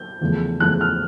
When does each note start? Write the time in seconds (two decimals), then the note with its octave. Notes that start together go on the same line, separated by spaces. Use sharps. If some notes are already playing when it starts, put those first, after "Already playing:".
Already playing: G6
0.21 E2 C#3 F3 A3
0.60 E2 C#3 F3 A3 F#6
0.81 F6